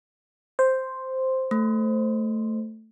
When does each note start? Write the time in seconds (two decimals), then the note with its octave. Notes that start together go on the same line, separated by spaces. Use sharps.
0.59 C5
1.51 A3